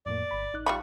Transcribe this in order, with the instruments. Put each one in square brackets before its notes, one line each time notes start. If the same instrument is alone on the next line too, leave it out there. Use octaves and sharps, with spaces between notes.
[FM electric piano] F2 A2 A#3 [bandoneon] D5
[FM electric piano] G1 B5
A1 D#4 F#6
[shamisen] G3 F4 B5 [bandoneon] C#6